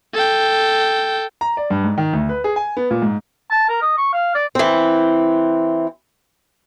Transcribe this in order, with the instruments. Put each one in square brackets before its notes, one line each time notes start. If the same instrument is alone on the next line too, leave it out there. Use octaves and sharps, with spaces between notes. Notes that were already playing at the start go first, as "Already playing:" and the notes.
[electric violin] A4 G5
[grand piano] A#5
D5
G2
G#2
D#3
D2
B4
G#4
G#5
B3
A#2
G#2
[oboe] A5
A#4
D#5
C#6
F5
D5
[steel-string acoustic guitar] E3 C4